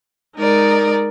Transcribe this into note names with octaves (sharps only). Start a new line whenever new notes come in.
G#3 D#4 A#4 D5